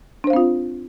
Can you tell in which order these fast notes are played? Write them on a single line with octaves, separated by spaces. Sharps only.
D4 C5 F5 C4 F4